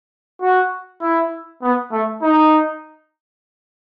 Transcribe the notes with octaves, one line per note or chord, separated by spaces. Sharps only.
F#4
E4
B3
A3
D#4